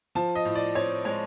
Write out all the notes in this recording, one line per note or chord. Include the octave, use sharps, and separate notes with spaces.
F3 A5
D#5
A2
D5
C4 C#5
G#3 C#5